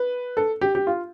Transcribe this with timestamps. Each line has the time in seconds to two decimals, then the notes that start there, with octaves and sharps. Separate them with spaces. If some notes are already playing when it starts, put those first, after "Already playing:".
Already playing: B4
0.37 A4
0.61 G4
0.75 G4
0.87 F4